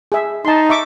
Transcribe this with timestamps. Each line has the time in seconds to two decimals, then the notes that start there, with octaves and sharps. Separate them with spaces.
0.12 G#4 E5
0.45 D#4 A5 C6
0.69 E5 C#6 D6